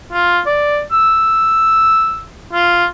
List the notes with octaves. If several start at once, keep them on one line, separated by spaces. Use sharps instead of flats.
F4
D5
E6
F4